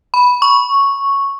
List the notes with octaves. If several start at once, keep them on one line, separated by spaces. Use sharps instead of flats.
B5
C#6